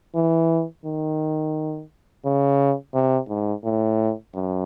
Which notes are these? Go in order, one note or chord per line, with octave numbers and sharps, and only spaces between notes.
E3
D#3
C#3
C3
G#2
A2
F#2